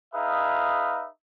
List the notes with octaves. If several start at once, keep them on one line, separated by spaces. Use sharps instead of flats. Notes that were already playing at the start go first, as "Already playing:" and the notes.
D#4 G#4 B4 E5 F5